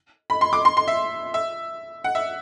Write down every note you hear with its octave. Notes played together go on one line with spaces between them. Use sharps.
B5
C6
D6
C6
C6
E5
E5
F#5
E5